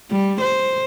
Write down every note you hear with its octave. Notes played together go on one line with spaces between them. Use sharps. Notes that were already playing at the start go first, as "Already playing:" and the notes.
G3
C5